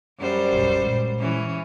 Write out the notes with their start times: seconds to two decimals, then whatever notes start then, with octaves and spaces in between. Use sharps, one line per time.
0.19 F#2 G3 C5
0.52 F#1 B1
0.81 A#2 G#3
1.20 E3 C#4